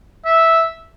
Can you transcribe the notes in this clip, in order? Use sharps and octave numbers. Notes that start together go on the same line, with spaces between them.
E5